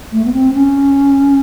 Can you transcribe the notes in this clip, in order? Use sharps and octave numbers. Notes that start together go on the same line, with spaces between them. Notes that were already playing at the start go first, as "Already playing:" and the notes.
A3
B3
C4
C#4